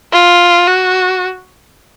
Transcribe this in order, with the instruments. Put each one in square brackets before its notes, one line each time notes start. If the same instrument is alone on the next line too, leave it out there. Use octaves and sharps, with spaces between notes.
[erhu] F4
F#4